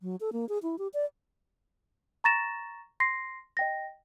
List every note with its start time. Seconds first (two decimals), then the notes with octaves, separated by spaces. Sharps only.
0.01 F#3
0.21 A4
0.33 A#3
0.49 G#4
0.63 E4
0.79 G4
0.94 D5
2.24 A#5 C#6 A6 A#6 E7
3.00 C6 A#6 C7
3.57 D#5 G5 A#6